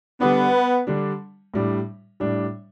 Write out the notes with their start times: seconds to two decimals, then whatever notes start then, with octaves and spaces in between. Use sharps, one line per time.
0.20 D3 G3 B3 D4
0.87 D3 G3 D4
1.54 A2 G3 D4
2.20 A2 G3 D4